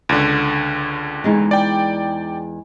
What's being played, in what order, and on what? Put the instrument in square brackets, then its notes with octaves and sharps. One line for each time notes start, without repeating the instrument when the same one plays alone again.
[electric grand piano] C#2 D3
[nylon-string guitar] E2 G#3 D#4
[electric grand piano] D5 G5